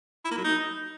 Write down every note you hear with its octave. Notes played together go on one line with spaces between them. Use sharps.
E4
A#3
F#3
D#4